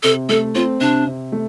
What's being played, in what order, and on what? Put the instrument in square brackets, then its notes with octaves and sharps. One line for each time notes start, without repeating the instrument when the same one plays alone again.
[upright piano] C3 [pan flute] A4
[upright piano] A3 [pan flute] A4
[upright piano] C4 [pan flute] F4
[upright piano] C3 [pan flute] D4
[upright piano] C3
A3